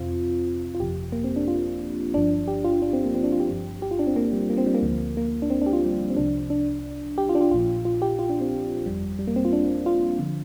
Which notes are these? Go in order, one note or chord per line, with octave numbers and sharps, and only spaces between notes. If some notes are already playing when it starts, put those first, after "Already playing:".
Already playing: F2 C3 C4 F4
F4
G1 F2 C3 F3 G4
A#3
C4
D4
F4
G1 G2 F3 D4
G4
F4
D4
C4
A#3
C4
D4
F4
G4
G1 G2 F3
G4
F4
D4
C4
A#3
G3
A#3
C4
G3
A#3
D2 D3 F3
A#3
D4
C4
D4
G4
F4
G3
C4
C2 C3 F3 D4
D4
G4
F4
D4
F4
A#1 A#2 F3 F4
F4
G4
F4
D4
C4
G1 F2 F3 G3
G3
A#3
C4
F4
D4
F4
D3 F3